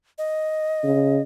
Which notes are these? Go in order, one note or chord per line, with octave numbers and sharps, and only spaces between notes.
D#5
C#3